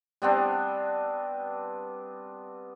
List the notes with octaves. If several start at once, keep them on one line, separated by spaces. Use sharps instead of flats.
G3 B3 C4 D4